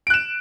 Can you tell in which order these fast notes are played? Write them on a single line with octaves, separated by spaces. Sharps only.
D7 F#6 E7